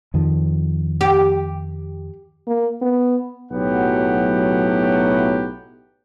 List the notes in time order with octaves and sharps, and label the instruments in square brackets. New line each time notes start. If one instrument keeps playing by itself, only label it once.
[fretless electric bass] F2 D#3 F3
[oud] G4
[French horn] A#3
B3
[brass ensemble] B1 A2 F#3 B3 G4 F#5